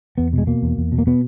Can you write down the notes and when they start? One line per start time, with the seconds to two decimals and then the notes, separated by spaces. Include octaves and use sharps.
0.18 E2 B3
0.33 B2 G#3
0.47 B2 A#3
0.62 E2
0.78 E2
0.92 B2
0.98 A#3
1.07 B2 B3